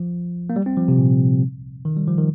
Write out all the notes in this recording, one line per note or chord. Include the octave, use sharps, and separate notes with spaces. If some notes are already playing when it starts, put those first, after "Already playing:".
Already playing: F3
A#3
G3
C4
F3
C3
A#2
D#3
G3
F3
D#3